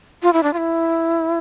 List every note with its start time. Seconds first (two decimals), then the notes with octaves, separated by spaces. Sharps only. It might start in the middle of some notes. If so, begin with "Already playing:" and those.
0.23 F4
0.33 E4
0.43 D4
0.53 F4
0.57 E4